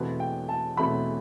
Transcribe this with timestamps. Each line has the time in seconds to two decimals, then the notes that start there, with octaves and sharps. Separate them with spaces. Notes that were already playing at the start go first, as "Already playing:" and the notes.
Already playing: E2 B2 A3 C4 B4
0.20 G5
0.49 A5
0.77 E2 B2 A3 C4 B5